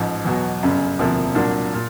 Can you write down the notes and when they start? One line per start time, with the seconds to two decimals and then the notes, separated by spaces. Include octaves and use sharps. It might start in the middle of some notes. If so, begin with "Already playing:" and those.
Already playing: A1 G#2 F3
0.25 E2 B2 F#3
0.62 G1 F#2 C#3
0.99 E1 D2 C3 F3 A#3
1.35 C2 A#2 F#3 A#3 D4
1.74 A#2